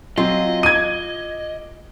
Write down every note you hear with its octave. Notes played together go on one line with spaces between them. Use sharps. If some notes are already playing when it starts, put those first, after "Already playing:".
F#3 C4 F4 D#5
D6 G#6 D#7